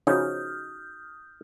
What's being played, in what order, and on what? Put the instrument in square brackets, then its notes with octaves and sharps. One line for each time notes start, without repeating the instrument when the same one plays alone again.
[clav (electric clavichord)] C#3 F3 C#4 [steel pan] D#4 F#4 [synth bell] D#6 F6 G6